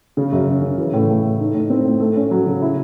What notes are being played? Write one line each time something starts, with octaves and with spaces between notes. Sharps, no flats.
C#3
F#2
C#4
C#3
E3
A2
A3
A3
D#4
A2
C4
A2
A3
C#4
F#3
C#3
E4